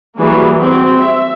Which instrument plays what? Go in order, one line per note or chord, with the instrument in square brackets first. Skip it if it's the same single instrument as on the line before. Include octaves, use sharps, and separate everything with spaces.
[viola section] E3 F#3 G3 A#3 G#4
C4 F#4
E5